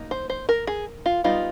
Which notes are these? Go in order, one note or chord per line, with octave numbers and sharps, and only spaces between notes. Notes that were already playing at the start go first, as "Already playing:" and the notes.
Already playing: F#3 A#3 D#4
C5
C5
A#4
G#4
F4
G3 B3 D#4 F4